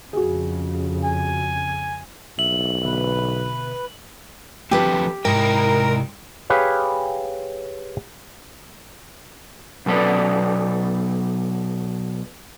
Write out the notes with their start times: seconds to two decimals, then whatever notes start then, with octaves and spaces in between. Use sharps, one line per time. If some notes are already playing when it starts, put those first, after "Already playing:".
0.13 F2 C#3 F#4 G#4
1.04 G#5
2.39 B1 E5 F#7
2.83 B2 D3 B4 E5
4.71 D2 F3 B3 C4 G4 B4 A5
5.25 G#2 C3 E4 A#4 G5
6.50 G4 G#4 B4 C#5 F5
9.86 B2 F#3 A4 B4 D5